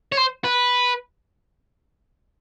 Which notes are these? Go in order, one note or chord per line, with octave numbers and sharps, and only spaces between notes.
C#5
C5
B4